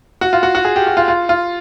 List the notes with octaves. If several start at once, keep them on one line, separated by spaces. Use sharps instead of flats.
F#4
F4
F#4
F#4
G#4
G4
F#4
F4
F4
F4